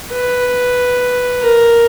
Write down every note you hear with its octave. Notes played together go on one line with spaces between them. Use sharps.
B4
A#4